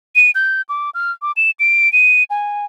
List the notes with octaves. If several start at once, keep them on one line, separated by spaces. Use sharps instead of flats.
D#7
G6
D6
F6
D6
E7
D7
D#7
G#5